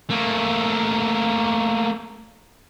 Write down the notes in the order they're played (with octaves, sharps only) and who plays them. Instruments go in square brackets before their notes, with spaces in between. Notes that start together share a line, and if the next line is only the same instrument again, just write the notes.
[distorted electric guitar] A3 A#3